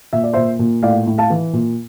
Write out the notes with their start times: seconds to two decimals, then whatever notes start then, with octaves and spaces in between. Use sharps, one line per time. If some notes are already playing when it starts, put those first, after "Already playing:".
0.13 A#2 E5
0.24 D5
0.33 A#2 C5 E5
0.59 A#2
0.83 A2 D5 F5
1.07 A2
1.18 F5 A5
1.30 E3
1.53 A#2